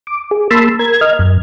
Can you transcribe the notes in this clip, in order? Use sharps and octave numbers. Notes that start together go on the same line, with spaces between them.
D6
G#4
A#3 A5 B5 C6 E6
A#4 G#6
D#5 F6
F#2